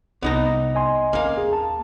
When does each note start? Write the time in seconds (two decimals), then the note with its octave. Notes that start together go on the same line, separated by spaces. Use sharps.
0.22 C2 B3 D#4 A#5
0.75 D#5 G#5 C6
1.13 A#3 C4 C#4 F5
1.38 D#2 G#4
1.53 A5